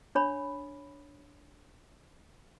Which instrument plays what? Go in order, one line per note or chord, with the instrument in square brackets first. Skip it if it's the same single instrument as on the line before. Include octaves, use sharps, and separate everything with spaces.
[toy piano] D4 C#5 B5